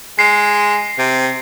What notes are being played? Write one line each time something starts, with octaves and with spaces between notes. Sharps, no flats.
G#3 C7
C3